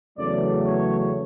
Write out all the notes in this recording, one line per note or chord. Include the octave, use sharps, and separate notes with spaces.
E2 C#3 F#3 A3 D5
C#5